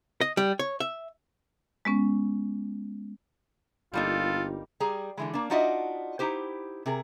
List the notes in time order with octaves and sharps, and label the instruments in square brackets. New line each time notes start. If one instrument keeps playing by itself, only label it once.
[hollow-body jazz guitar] D#5
G3
C#5
E5
[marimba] G#3 B3 C#4
[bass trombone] G1 [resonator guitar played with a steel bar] G3 A#3 D#4 [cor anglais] F4 [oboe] A4
[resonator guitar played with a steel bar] G3 G#4 A#5
D3 E3 G#3
A#3 D4
D4 D#4 F4 F#4 D#5 E5
D#4 E4 G4 C5
C3 G#4 A#4